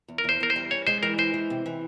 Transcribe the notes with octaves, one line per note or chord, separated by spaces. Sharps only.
E2
A#4
E2 C5
E2 A#4
C5
G3
C#4 C#5
G#3 C5
E3 A#4
G#3 C5
E3
C3
E3